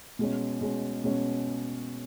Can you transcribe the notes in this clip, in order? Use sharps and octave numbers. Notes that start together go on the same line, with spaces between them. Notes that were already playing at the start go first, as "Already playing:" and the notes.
B2 G#3 C#4
B2 G#3 C#4
B2 G#3 C#4